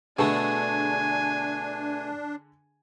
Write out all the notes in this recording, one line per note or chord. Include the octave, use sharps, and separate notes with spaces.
B2 D3 A3 D4 G#4 A4 G#5